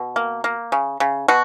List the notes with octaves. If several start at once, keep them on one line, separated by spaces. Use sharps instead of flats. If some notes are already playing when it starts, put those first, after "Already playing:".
Already playing: B2
A#3
A#3
C#3
C#3
B2 F#4